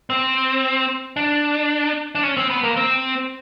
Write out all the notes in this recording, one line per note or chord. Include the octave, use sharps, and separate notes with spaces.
C4
D4
D4
C#4
C4
B3
A#3
C4